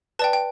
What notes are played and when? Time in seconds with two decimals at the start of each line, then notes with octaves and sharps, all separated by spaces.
0.19 B4 D5 G5 A5
0.33 G5